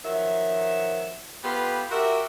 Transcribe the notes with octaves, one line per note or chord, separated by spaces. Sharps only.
D#3 F3 F#3 E5
B3 F4 G4 A4 B4
F#4 G4 A#4 E5